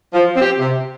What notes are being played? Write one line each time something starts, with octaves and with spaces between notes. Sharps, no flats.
F3
C4
G4
C3